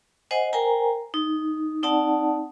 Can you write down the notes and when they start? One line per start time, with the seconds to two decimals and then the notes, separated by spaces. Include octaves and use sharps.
0.31 C5 D#5 F#5 G#5
0.53 A#4 C5 G5 G#5 A#5
1.14 D#4
1.83 C4 D#4 D5 F#5 A5